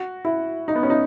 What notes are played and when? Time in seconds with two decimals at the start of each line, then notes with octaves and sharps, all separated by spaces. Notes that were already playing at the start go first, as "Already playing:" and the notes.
Already playing: F#4
0.25 E4
0.68 D#4
0.75 B3
0.83 C#4
0.90 D#4